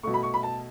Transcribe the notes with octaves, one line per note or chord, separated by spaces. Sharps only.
B2 A3 C#6
B5
C#6
B5
A5